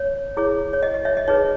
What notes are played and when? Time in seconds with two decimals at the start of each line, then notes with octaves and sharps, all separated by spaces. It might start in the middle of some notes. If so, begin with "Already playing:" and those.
Already playing: C#5
0.37 E4 G#4 C#5
0.73 C#5
0.83 D#5
0.94 D#5
1.05 C#5 E5
1.17 D#5
1.28 D#4 G#4 B4 C#5